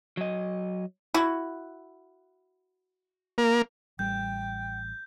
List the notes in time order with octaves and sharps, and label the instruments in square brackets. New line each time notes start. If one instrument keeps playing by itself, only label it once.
[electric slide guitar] F#3 D#5
[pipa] E4 F#4
[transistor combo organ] A#3
[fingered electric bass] A1 G3 [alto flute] G5 [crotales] G6